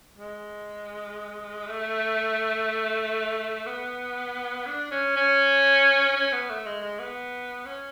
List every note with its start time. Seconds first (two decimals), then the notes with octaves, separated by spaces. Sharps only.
0.18 G#3
1.67 A3
3.66 B3
4.66 D4
4.91 C#4
5.17 C#4
6.16 C#4
6.32 B3
6.49 A3
6.66 G#3
6.82 G#3
6.99 B3
7.65 C#4